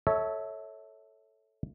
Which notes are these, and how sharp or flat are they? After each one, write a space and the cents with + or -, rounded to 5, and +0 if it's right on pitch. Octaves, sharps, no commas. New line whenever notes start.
A4 +0 C#5 +0 E5 -25